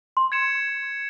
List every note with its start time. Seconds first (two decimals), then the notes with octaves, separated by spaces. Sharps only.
0.17 C6
0.32 G#6 C#7 E7